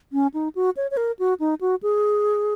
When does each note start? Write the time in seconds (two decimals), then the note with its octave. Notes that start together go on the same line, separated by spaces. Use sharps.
0.13 C#4
0.34 D#4
0.55 F#4
0.77 C#5
0.91 C#5
0.97 A#4
1.19 F#4
1.40 D#4
1.61 F#4
1.83 G#4